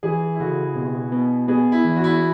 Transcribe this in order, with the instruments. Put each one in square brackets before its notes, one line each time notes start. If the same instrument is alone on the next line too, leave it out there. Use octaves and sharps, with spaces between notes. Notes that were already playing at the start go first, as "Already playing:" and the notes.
[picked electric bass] E3 [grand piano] G#4
[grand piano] E4
[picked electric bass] C#3 [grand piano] F#4
[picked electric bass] B2
B3
[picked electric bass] B3 [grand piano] G#4
[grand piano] E4
[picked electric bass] E3
[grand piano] F#4
E4
F#4